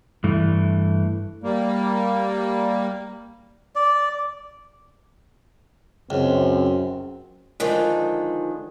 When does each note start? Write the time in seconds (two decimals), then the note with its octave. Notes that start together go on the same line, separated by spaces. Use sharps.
0.24 G2 E3 A3
1.42 G3 A#3
3.76 D5
6.10 C#2 F#2 C4
7.60 D3 D#3 F3 G#3